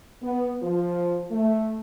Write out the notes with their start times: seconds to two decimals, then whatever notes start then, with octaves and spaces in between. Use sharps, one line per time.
0.22 B3
0.62 F3
1.31 A3